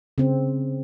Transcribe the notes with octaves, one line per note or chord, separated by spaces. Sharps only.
C#3 C4